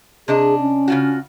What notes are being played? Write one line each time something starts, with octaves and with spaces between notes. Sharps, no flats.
C3 D4 G#4 D#5
C#4
C#3 F4 F#4